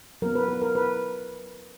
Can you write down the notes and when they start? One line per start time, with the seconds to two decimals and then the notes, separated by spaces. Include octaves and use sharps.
0.22 F#3 B3 A#4
0.35 B4
0.49 A#4
0.62 A#4
0.75 B4